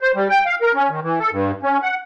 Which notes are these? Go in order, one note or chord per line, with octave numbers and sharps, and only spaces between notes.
C5
G3
G5
F5
A#4
C#4
D#3
E3
A4
G2
C#4
F#5